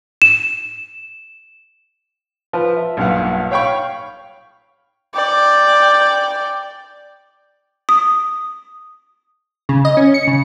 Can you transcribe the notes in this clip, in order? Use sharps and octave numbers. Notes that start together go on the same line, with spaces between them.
E7
F3 B4
E5
B1 G2 A#2 F5 F#5
C#5 F5 G5 B5 C#6
D5 G5
D#6
C#3
D#5
C#4
C#7
C#3